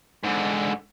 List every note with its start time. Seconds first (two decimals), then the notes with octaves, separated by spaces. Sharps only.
0.24 G#2 D3